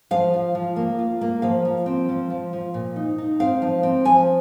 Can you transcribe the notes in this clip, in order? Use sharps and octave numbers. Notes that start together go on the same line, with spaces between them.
F3 F5
F3
F3
A#3
F4
A#3
F3 F5
F3
C4
F3
F3
F3
A#2
D#4
D#4
C4 F5
F3
C4
F3 G#5